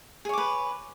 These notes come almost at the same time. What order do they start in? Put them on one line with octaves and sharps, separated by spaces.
G#4 C#5 D6 B4